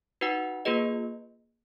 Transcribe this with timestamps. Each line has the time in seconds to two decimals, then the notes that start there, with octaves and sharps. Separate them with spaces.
0.21 D#4 F#4 B4 F#5
0.65 A#3 F4 G#4 B4 D#5